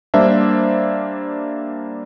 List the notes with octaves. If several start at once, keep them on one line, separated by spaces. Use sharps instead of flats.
G3 A#3 D4 C5 E5